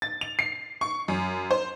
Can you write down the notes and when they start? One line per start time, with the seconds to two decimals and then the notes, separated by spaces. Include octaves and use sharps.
0.02 A6
0.21 F7
0.39 C7
0.81 C#6
1.08 F#2
1.51 C5